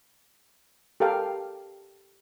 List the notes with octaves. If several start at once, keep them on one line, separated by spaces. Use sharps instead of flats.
G4 A4 A#4 F5 G5